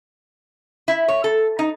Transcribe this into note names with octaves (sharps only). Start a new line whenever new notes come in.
E4
C#5
A4
D#4